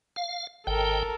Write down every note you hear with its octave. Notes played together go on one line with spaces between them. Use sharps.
F5
G#1 A4 A#4 G5